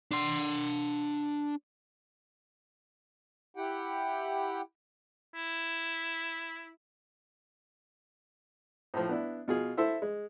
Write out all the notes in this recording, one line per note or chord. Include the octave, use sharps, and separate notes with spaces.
D4 C6
E4 G4 F#5 G5
E4
A2 F3
B3 D4 E4
B2 F4 G#4
E4 A4 C5 E5
G#3